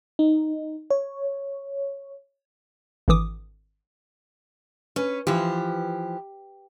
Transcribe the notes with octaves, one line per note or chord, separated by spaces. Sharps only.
D#4
C#5
G#1 D3 E3 D6 D#6
C#4 B4
E3 F3 G4